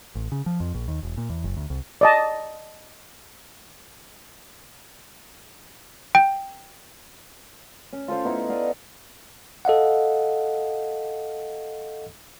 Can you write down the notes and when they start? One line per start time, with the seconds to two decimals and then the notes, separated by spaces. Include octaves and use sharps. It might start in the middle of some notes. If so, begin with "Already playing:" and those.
0.15 A1
0.32 C#3
0.46 F3
0.60 F2
0.74 A#1
0.88 D#2
1.03 E1
1.17 A#2
1.30 E2
1.44 F#1
1.57 D2
1.70 C2
2.01 D5 D#5 A5
6.15 G5
7.93 C#4
8.08 F4 A4 C5 F5
8.25 B3 D#4 E4 A4
8.49 D5 D#5 F5 F#5
9.65 A4 D#5 F5 F#5